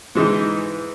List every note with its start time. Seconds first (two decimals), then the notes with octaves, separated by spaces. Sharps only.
0.15 G#2 E3 G#3 D#4